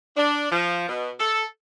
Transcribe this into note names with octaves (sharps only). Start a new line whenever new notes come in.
D4
F3
B2
A4